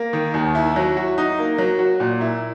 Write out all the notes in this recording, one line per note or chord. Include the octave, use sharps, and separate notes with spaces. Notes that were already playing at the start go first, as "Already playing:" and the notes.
Already playing: A#3
D#3
D#2
E4
F#3
F#4
D#4
A#3
F#3
F#4
A#2
E4